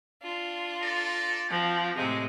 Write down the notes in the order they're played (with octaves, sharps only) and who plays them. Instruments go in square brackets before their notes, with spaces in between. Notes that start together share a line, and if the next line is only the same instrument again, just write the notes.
[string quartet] D4 F4
[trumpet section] A4 D5 A#5
[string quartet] F3 [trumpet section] C4 F#4 G5
[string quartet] A2 C3 G#3